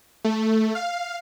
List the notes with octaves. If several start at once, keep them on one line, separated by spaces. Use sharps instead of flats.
A3
F5